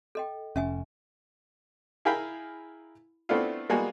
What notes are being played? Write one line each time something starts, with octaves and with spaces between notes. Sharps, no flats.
A4 D#5 G5
F1 C#4 E5 G#5
E4 G#4 A#4 F5 G5 B5
A3 B3 C4 D4 E4 F4
G3 G#3 A#3 B3 F#4 G#4